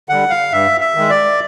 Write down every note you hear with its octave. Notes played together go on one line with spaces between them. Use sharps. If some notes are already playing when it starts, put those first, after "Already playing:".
D3 G3 F#5
F5
G2 E5
E5
D#3 G#3
D5